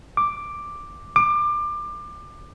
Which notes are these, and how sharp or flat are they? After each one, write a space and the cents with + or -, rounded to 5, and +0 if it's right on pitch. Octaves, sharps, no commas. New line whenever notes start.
D6 +5
D6 +25